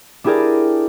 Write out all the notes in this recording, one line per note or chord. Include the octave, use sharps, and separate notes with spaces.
D4 E4 G4 G#4 A#4 D5